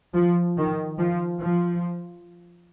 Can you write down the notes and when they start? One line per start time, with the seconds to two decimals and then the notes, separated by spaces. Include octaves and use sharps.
0.13 F3
0.56 D#3
0.98 F3
1.40 F3